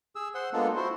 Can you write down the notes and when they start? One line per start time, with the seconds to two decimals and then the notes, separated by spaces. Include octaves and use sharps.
0.16 G#4 E6
0.35 C5 F#5 C6
0.53 G#3 A#3 B3 D4 F4 A4
0.76 E4 F#4 C5